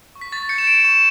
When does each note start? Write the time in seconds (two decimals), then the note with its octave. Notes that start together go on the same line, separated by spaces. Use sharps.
0.15 C#6
0.21 B6
0.32 C#6 A6
0.49 G6 C#7
0.58 E7
0.67 G6 D7
0.84 C#6 E7